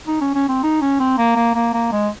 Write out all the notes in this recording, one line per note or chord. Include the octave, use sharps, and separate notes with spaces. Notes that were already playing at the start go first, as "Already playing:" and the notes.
D#4
C#4
C#4
C4
D#4
C#4
C4
A#3
A#3
A#3
A#3
G#3